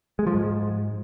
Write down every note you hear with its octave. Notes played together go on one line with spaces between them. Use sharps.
G#3
F3
G#2